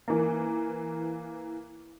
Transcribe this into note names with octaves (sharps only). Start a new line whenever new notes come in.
E3 A#3